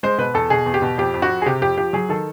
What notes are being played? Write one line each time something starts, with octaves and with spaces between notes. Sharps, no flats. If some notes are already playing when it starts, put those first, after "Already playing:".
G#3 C5
B2 B4
E2 A4
B2 G#4
E2
G4
B2
F2 G4
F2
F#4
F2
G#4
C3 G4
F2 G4
F3 G4
F#3 G#4
D#3 A4